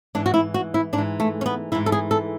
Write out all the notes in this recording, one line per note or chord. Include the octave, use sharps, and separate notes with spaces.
G#2 E3 D4
F#4
E4
F#4
E4
G#2 D4
E3
A3
C#4
B3
G#2 E3 E4
A4
G#4
A4